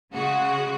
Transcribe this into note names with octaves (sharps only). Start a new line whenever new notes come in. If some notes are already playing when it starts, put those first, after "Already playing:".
C#3 G#3 F#4